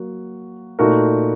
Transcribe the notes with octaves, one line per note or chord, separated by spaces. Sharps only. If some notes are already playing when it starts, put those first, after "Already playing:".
Already playing: F#3 A#3 F#4
A#2 A3 D#4 F#4 A#4